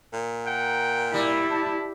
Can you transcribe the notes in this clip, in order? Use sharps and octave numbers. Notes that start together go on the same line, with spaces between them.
A#2
A#4 F#5 G5
G3 E4
A5